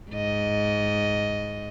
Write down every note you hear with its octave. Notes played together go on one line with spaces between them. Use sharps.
G#2 D#5